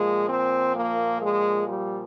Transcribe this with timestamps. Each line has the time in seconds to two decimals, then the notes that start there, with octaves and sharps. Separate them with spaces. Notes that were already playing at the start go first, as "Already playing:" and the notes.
Already playing: A#2 F3 G#3
0.29 C4
0.75 A#3
1.22 G#3
1.68 G3